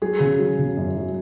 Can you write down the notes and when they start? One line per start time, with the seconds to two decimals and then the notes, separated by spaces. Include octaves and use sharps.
0.02 F#3 G#4
0.20 C#3
0.39 F#3
0.59 C#3
0.77 F#2
0.97 F#3